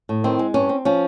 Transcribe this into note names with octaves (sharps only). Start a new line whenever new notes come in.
A2
D#3 C4
G#3
G2 C#4
C4
F3 C#4